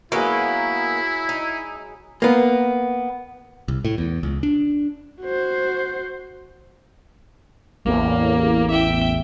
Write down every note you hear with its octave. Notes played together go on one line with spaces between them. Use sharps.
F#3 G#3 A#3 B3 C#4 E4
D#4
A#3 B3
C2
A2
E2
C#2
D4
F#4 C5
A1 E2 A#3
E5 G5